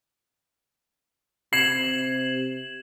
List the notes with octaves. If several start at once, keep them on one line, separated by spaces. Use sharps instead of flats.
C3 G#6 C7 E7 F#7